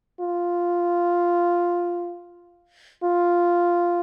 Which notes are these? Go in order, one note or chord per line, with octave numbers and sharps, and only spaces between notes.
F4
F4